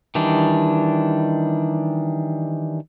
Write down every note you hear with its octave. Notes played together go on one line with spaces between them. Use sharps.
D#3 E3 G3 D4